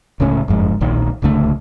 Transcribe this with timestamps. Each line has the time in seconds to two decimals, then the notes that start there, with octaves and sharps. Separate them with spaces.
0.20 D1 C#2 A2 C#4
0.48 F#1 F2 G#2
0.80 D1 A#1 A#2 D#3
1.22 D1 C#2 D3 A3